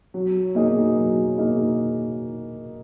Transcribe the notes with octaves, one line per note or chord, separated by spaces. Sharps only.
F#3
A#3 D#4 G#4
F#3
A#3 D#4 G#4